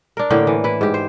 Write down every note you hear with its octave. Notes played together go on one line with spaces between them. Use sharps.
D4 A#4
A2 D3 A#3 G5
E3
E4 B4
G#2 G4
C5